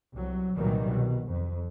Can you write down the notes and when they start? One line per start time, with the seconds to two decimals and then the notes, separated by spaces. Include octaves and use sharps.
0.13 C2 F#3
0.56 C2 A#2 D#3 E3 F#3 G3
0.90 B2
1.29 F2